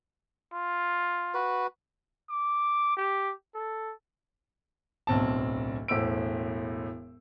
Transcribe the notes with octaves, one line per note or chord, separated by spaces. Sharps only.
F4
F#4 B4
D6
G4
A4
D1 B1 C4 A5
E1 A2 C5 E6 D7